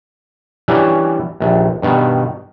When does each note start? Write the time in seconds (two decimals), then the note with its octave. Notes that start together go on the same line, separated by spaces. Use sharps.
0.68 E3 F#3 G3 C#4 D4 E4
1.40 A#1 D#2
1.82 G2 B2 D#3